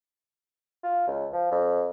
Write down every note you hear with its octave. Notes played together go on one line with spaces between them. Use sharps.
F4
C#2
F3
F2